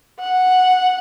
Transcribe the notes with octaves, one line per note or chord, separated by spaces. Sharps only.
F#5